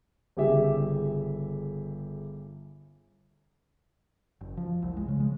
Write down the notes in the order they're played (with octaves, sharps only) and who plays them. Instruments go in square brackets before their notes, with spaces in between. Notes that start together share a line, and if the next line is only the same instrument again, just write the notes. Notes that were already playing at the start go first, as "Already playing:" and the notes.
[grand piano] G1 C#3 G4 G#4 E5
[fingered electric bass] F#1
F3
C2
G#3
C#3
G#3